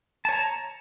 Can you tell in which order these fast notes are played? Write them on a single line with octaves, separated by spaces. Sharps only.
A5 C#5 A#5